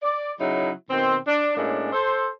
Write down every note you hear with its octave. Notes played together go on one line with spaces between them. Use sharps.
D5
C#3 F#3 D#4 E4
B2 D#3 C4
D4
A2 G#3 A#3 C#4 D4
A4 C5